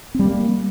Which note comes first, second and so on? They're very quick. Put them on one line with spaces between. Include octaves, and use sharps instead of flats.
C4 G3 A#3